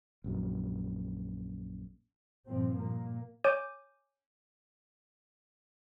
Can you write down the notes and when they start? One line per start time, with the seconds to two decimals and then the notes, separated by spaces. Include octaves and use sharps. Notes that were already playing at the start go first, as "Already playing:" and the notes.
0.24 A#1 F#2
2.47 G2 A#2 F3 C4
2.78 A#2 A#3
3.44 C#5 G#5 D6 G6 D#7